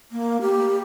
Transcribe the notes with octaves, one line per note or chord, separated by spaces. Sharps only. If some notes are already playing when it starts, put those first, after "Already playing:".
A#3
G4